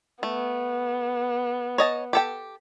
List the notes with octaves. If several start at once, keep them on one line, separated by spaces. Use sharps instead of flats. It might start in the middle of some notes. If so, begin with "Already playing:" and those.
A3 B3
C#5 D#5 A5
G4 A4 G5